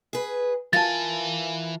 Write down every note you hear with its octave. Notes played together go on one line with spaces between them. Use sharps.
G#4 B4
E3 F4 A#4 G#5 A5 A6